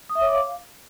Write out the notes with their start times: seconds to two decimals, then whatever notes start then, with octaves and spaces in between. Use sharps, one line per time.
0.09 D#6
0.15 E5
0.21 C#5
0.27 D6
0.33 F5